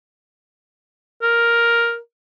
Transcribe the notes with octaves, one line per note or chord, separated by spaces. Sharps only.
A#4